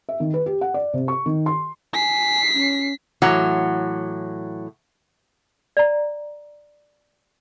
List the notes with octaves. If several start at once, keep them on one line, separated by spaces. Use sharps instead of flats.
E5
D#3
B4
G4
F#5
D5
C3
C#6
D#3
C6
G#5 B6 C7
C#4
A2 E3 F#3 F#5
D5 A#5